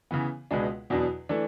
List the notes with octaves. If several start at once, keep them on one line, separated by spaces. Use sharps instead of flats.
C#3 E3 B3
C#2 B2 G#3 B3 D4
E2 B2 F#3 B3 D4
E3 A3 D4